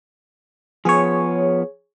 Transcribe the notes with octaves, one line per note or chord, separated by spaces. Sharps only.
F3 B3 G#4 C#5